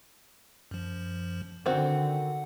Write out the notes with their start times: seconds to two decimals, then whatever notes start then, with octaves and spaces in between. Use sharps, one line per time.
0.71 F#2 F3
1.66 D3 D#3 C4 F#4 F#5